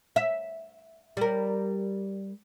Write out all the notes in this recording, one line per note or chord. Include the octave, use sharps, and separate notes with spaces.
E5
G3 A#4